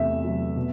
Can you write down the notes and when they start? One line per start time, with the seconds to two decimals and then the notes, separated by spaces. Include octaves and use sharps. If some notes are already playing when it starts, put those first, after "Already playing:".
Already playing: E2 C3 A3 E5
0.24 F#3
0.56 B2